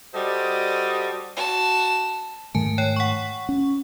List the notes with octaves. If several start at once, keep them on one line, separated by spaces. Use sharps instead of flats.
G3 F#4 A4 C5 D5 D#5
F#4 A5
G#2 D#3 A3 G#5 A5
C#5 G5
F#5 C#6
C#4